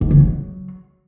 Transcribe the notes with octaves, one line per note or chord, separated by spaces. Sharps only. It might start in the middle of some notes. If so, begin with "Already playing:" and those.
G#2
C#3
F#3